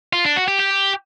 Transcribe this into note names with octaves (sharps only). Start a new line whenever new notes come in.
F4
D4
F#4
G4
G4